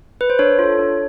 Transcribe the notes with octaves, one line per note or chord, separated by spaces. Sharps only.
B4
C5
D4 C#5
F4 A4
D4